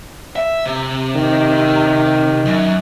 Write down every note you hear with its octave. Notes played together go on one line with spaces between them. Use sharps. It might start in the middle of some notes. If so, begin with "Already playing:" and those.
E5
C3
D#3
F#2